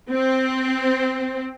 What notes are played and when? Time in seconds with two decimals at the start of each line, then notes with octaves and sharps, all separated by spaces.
0.12 C4